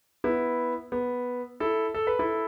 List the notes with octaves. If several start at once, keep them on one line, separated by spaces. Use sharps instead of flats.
B3 E4
B3
E4 A4
A4
B4
E4 A4